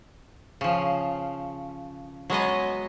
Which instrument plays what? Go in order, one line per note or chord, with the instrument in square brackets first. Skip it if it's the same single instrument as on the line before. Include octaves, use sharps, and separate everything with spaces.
[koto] C#3 F3
F#3 G#3 B3 D#5